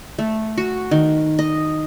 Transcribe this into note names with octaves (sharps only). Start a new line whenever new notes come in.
A3
F#4
D#3
D#5